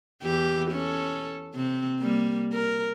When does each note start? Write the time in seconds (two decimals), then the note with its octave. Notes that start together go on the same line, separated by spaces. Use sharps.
0.23 E2 E3 G4
0.71 C#4 A4
1.55 C3 C4
2.00 G3 A#3
2.53 A#4